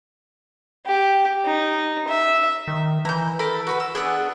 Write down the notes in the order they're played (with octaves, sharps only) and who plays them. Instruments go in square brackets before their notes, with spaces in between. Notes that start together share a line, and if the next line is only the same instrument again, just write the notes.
[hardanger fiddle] G4
D#4
E5
[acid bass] D#3
[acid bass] E3 [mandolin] A#5 G6
[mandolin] A4 A#4 B5
F#4 B4 B5
E6
[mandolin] B3 D4 F#6 [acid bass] G#4